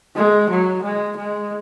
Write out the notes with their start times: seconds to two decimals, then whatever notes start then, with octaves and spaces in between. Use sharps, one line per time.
0.16 G#3
0.49 F#3
0.83 G#3
1.16 G#3